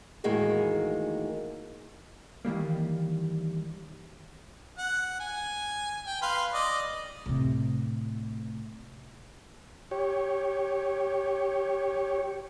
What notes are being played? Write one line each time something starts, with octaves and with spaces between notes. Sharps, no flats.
E2 A2 D#3 G#3 A#3 F#4
D#3 E3 G3 A#3
F#5
G#5
G5
B4 F5 C6
D5 D#5
A2 C3
G4 C#5